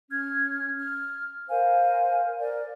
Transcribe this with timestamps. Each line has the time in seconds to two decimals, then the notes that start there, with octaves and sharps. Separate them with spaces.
0.11 C#4 F6 G#6
0.79 F6
1.49 A#4 C5 F5 G#5
2.40 A#4 D5